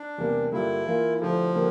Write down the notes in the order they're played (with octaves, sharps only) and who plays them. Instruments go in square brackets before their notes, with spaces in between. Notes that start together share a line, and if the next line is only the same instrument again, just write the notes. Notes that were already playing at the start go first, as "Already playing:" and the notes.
Already playing: [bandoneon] D4
[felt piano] E2 C3 G3 A#3
[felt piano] G2 D3 G3 A#3 F4 [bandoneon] E4
[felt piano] E3 A#3 F4
[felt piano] D3 A3 E4 G4 [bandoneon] F3
[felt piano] D3 G3 A#3